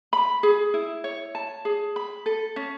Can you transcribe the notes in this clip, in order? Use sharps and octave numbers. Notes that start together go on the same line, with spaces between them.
B5
G#4
E4
C#5
A5
G#4
B5
A4
C#4